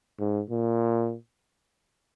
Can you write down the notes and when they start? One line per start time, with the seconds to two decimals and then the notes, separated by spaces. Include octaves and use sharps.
0.20 G#2
0.50 A#2